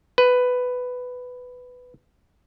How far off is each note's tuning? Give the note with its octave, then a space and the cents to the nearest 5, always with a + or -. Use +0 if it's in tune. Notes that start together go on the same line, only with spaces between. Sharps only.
B4 +10